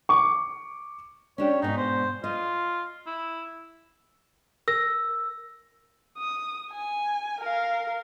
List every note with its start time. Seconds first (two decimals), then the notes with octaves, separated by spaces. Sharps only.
0.09 C#6 D6
1.38 C#4 D4 G4 C#5
1.62 G#2 B2 D#4
1.77 C5
2.24 F4 D#5
3.07 E4
4.68 A#4 E6 A#6
6.18 D#6
6.71 G#5
7.40 A#4 F5